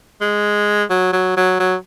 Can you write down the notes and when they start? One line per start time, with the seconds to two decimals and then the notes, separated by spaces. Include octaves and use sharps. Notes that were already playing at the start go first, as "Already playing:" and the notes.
0.21 G#3
0.90 F#3
1.13 F#3
1.37 F#3
1.60 F#3